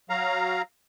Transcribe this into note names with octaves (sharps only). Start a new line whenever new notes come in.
F#3 F5 A#5